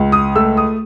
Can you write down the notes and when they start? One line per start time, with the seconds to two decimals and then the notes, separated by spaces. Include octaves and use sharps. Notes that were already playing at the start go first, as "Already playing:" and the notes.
Already playing: C#2
0.12 D#6
0.36 A3 E6
0.57 D#6